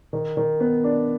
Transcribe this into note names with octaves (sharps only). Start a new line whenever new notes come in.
D#3
D#3
B3
D4